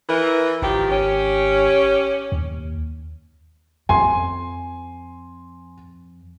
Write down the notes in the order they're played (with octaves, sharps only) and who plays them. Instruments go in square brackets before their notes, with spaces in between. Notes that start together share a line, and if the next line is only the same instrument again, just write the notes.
[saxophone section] E3 A#4
[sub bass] G#1 [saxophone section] D#3 F3 G4
[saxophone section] C#4 G4
[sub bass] D#2
[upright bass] F2 [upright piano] G#5 C6